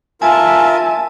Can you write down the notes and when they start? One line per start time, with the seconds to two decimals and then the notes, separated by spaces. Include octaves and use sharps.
0.22 F4 A#4 E5 G#5 A5